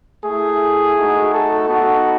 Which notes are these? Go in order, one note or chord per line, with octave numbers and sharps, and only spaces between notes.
A3 E4 G#4
A3 D#4 F#4
A4
B3 D#4 F#4